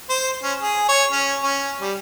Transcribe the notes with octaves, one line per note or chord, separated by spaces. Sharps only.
C5
C#4
G#4
C#5
C#4
C#4
G3